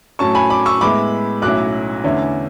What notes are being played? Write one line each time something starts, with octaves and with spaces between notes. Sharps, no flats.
A2 F#3 C#4 A5 C#6
G#5 B5
B5 D6
C#6 E6
A2 G#3 B3 E4 B5 D6
B1 A2 F#3 C#4 E4 D6 F#6
E2 D3 A3 C#4 E4